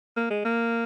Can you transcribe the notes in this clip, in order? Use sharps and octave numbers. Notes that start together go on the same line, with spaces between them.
A#3
G#3
A#3